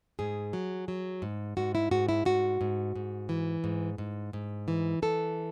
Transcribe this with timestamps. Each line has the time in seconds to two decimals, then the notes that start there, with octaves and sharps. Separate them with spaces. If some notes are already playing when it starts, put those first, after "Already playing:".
0.19 G#2 G#4
0.53 F#3
0.88 F#3
1.22 G#2
1.57 G#2 F#4
1.75 E4
1.91 G#2 F#4
2.09 E4
2.25 G#2 F#4
2.61 G#2
2.95 G#2
3.29 E3
3.64 G#2
3.98 G#2
4.33 G#2
4.68 E3
5.02 E3 A4